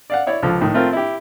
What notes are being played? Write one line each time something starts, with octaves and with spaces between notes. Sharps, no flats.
D5 F5 F#5
E4 C#5 D5
C#2 F3 A4
A2 D#3
A3 C4 F4 A#4
E4 G4